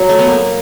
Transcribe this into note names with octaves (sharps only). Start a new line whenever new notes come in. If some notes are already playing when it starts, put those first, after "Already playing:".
Already playing: F#3
A3
B3
A#3